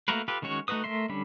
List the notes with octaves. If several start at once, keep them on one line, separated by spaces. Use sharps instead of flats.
A3 A#3 F#4 A#4 B4
F4 G4 A4 B4
D#3 G#3 C#4 F#4 C#5
A3 D#4 F#4 B4 D#6
A3 A#4 E5 C6
D3 G3 C#4 D4 B5